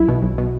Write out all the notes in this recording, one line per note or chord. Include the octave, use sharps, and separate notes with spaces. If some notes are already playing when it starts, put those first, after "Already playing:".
Already playing: B1 E4
B2
B1
B2